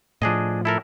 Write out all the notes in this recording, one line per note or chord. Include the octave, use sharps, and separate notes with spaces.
A2 F3 D4 G#4 D#5
E4 A4 A#4